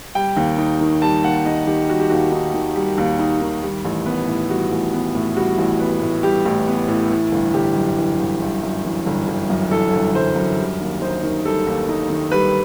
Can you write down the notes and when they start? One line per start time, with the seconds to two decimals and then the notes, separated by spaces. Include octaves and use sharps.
0.15 G3 G5
0.37 D#2
0.58 D#4
0.81 D#3
1.02 G3 A5
1.24 D#2 F#5
1.45 D#4 D#5
1.67 D#3 G4
1.88 G3 F#4
1.99 G4
2.10 D#2 F#4
2.32 D#4
2.54 D#3
2.76 G3
2.98 D#2
3.19 D#4
3.41 D#3
3.63 G3
3.85 A1
4.06 B3
4.28 A2
4.50 G3 F#4
4.72 A1
4.93 B3
5.15 A2
5.36 G3 F#4
5.58 A1
5.80 B3
6.02 A2
6.23 G3 G4
6.45 A1
6.67 B3
6.88 A2
7.10 E3
7.32 G1
7.54 G1 G4
7.76 F#2
7.97 E3
8.19 G1
8.41 G1
8.63 F#2
8.85 E3
9.06 G1
9.28 G1
9.50 F#2
9.71 E3 A4
9.93 G1
10.15 G1 C5
10.36 F#2
10.58 G3
10.80 D#2
11.02 D#4 C5
11.24 D#3
11.45 G3 A4
11.67 D#2
11.89 D#4
12.10 D#3
12.32 G3 B4